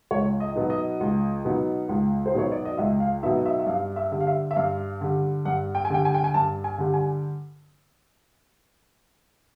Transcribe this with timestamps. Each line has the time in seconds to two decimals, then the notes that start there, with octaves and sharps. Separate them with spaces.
0.11 C#2 C#5
0.40 D#5
0.56 B2 F#3 B3 D#4
0.70 D#5
1.00 C#2
1.45 B2 F#3 B3 D#4
1.89 C#2
2.26 C5
2.34 B2 F#3 B3 D#4 C#5
2.52 D5
2.65 D#5
2.78 C#2 E5
3.00 F5
3.23 B2 F#3 B3 D#4 E5
3.38 D#5
3.46 E5
3.60 E5
3.67 G2 F5
3.96 E5
4.11 D3 G3
4.21 F5
4.27 E5
4.51 E5
4.56 G2 F5
5.01 D3 G3
5.45 G2 F#5
5.75 G5
5.85 G#5
5.90 D3 G3 G5
6.05 G#5
6.14 G5
6.24 G#5
6.34 G2 A5
6.64 G#5
6.78 D3 G3
6.94 G#5